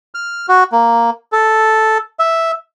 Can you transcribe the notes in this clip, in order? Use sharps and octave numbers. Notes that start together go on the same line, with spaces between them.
F6
F#4
A#3
A4
E5